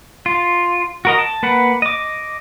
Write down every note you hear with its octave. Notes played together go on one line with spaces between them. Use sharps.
F4
F#4 A#4 D#5
A5
A#3 B4 F#5
D#5 D6